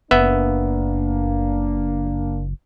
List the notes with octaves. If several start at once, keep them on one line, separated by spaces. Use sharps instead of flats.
F#1 A#3 B3 D4 E5